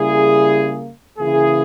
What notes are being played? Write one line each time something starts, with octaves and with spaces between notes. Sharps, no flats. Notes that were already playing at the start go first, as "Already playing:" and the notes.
Already playing: C#3 G3 A#3 E4 G#4
C#3 E3 A#3 E4 G#4